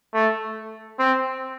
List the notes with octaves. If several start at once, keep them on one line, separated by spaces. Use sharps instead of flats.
A3
C4